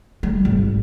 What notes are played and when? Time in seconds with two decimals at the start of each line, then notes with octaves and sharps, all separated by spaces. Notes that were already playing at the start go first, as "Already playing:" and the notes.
0.23 G3
0.45 G#1